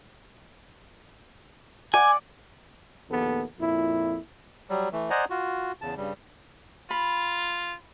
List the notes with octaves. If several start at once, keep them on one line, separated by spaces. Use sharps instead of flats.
D5 F#5 G#5 D6
A#1 D#2 B3 A4
F2 A#2 E4
F#3 G3
E3 A3
C5 D5 D#5 F#5 G#5 A#5
F4 F#4
E2 C#3 A5
G2 C#3 G3
F4 B5